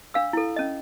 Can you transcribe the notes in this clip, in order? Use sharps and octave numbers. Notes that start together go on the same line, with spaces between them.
D4 F5 E6
E4 A4
C#4 D#5